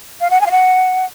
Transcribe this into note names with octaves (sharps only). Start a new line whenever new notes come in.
F5
F#5
G#5
F5
F#5